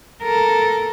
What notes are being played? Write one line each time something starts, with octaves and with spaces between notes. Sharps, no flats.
A4 A#4